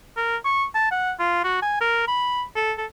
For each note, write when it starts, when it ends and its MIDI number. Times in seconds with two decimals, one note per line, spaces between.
0.17 0.37 70
0.45 0.65 85
0.75 0.90 81
0.91 1.12 78
1.19 1.43 65
1.44 1.58 66
1.62 1.79 80
1.81 2.04 70
2.08 2.43 83
2.56 2.73 69
2.78 2.86 69